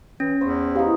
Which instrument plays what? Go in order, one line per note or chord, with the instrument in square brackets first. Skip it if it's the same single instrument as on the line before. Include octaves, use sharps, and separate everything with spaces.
[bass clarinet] E3 [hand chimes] C#4
[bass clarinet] E2 [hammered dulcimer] C5 B5 C#6
[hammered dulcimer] E3 D#4 [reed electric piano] G4 F5